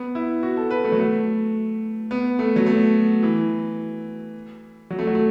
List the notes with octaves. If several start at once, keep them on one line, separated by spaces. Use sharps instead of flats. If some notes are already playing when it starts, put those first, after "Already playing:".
Already playing: B3
E4
F#4
A4
B4
A3
F#3
A3
B3
A3
F#3
A3
E3
F#3
A3
F#3
A3